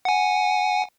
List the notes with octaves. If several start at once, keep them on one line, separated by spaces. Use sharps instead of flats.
F#5 G#5